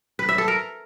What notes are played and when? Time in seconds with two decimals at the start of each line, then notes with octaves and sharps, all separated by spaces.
0.19 B4
0.29 E5
0.38 A4
0.48 A#4